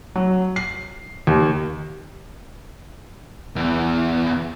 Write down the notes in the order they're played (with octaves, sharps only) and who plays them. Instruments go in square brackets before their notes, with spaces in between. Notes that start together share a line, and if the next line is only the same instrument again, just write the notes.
[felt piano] F#3
C7
D#2
[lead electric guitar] E2 E3